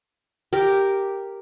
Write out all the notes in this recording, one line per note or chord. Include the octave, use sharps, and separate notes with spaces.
G4 A#4